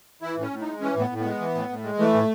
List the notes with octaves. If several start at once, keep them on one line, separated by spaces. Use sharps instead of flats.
E3 E4
A2 C#4
A2
D#4
G#3
E3 C#4
A2 B3
A2
B3
G#3
E3
A2
A2
G#3
E3 A3
A2